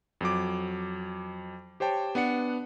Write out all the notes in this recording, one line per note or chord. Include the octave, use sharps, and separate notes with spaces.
F2 F#3 D6
G4 C5 C#5 G5 A5
B3 D4 F#5 C#7